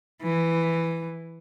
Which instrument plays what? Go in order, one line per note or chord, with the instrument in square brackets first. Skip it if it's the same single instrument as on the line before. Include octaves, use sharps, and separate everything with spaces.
[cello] E3